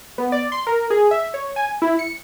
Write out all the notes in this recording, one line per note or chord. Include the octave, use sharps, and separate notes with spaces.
B3
D5
C6
A#4
G#4
E5
C#5
G#5
E4
C#7